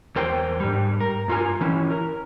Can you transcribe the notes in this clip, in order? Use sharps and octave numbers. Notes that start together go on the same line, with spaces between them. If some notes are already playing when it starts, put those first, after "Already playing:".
E2 A#4 C5 G5
G#2 G3
A#4
G2 F4 A#4 G#5
E3 C#4 E4
A#4